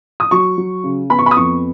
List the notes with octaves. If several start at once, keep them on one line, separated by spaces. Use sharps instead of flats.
D#6
F#3 C#6
F#3
C#3
B3 B5
C#6
B5
D#6
F2 C#6